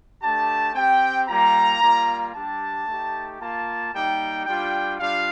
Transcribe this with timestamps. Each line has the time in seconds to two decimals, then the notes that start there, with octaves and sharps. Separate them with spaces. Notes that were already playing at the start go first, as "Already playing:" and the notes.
0.21 A3 D4 G4 A5
0.73 C4 G4 G5
1.27 G3 A#3 F4 A#5
1.80 G3 A#3 F4
2.34 G3 D4 G4 A5
2.86 A3 D#4 G4
3.40 A#3 F4 A5
3.93 G3 A#3 D#4 G4 G5
4.46 G3 D4 F4 G5
4.99 G3 D4 F4 F5